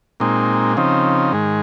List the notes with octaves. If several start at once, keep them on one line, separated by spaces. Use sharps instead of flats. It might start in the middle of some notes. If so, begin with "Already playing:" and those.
A#2 G#3 C4 D#4
C#3 F3 C4 D#4
G#2 D#3 G#3